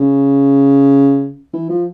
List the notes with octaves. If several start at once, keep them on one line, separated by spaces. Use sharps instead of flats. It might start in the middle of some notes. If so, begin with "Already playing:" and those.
Already playing: C#3
E3
F3